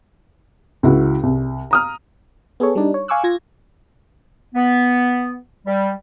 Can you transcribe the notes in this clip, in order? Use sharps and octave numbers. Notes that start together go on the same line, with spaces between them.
C#2 E4 F#4
C2
A#5 D#6 F6
B3 G#4 A4 C#5
G3 D4 D#4
C#5
F5 G#5 C#6 D6 E6 F#6
F4 G#6 A#6
B3
G3